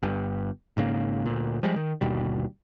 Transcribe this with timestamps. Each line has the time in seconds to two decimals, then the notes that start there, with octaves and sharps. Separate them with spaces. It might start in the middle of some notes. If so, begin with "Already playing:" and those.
0.03 G1 G2
0.77 G#1 G#2 C#3 A#3
1.26 D2 A#2
1.63 F3 G3 G#3
1.76 D#3
2.01 G1 D#2 B2 G3